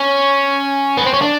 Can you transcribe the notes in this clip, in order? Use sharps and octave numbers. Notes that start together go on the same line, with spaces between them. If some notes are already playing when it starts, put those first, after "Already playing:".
Already playing: C#4
B3
C4
C#4
D4